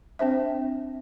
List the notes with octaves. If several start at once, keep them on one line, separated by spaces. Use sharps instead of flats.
C4 D4 C5 E5